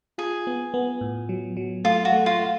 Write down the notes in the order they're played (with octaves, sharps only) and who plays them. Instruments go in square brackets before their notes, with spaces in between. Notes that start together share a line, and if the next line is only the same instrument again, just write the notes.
[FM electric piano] F4 [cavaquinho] G#4
[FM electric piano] B3
B3
A2
F#3
F#3
[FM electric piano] A3 [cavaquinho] F4
[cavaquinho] F#4
[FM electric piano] A3
[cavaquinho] F4
[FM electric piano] A3